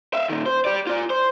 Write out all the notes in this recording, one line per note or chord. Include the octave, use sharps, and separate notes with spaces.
E5 F5
A#2 D#3
C5
G4 D5
F4 D5
C5